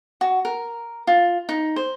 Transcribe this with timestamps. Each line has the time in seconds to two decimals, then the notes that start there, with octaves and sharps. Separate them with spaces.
0.21 F#4
0.45 A#4
1.07 F4
1.49 D#4
1.76 C5